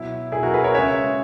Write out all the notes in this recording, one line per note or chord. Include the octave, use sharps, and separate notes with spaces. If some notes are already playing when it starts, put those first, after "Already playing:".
Already playing: B2 F#3 E4
B2 F#3 E4 G#4
F#4 A#4
G#4 B4
A#4 C#5
C#3 G#3 C#5 E5